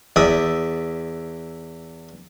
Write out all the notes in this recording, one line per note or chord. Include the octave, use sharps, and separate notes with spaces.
E2 D5 E5 D#6